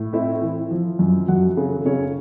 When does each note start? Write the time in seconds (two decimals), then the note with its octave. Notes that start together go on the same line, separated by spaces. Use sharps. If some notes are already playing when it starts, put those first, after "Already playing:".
Already playing: A2
0.13 C4 E4 E5
0.42 E3
0.71 F3
0.99 F#2
1.28 F#2 F#4 F#5
1.57 C#3
1.85 C#3 C#4 C#5